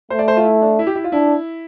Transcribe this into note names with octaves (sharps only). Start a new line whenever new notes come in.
A3 C5
D5
C5
F4
E4
D4
E4
G4
E4
F4
D4 E4